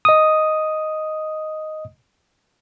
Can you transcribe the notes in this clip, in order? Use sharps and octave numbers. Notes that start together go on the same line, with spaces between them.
D#5 D#6